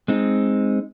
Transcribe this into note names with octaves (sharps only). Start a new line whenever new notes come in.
G#3 C4 D#4